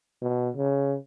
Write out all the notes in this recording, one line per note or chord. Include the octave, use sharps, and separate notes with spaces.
B2
C#3